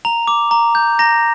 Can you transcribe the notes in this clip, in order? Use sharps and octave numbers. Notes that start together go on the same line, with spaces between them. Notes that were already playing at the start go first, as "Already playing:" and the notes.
A#5 F7
D6
A#5
G6
A#5 A#6